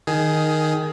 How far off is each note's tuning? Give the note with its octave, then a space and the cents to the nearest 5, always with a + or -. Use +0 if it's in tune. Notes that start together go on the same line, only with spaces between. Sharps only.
D#3 +0 G#4 +10